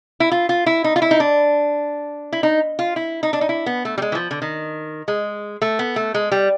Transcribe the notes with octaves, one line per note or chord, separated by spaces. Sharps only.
E4
F4
F4
E4
D#4
F4
E4
D#4
D4
E4
D#4
F4
E4
D#4
D4
D#4
E4
B3
A3
G3
G#3
E3
F3
D3
D#3
G#3
A3
B3
A3
G#3
G3